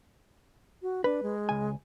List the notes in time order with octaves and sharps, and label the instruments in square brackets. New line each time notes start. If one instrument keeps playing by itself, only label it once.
[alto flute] F#4
[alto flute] D4 [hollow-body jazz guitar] B4
[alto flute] G#3
[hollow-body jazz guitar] C#2 G#5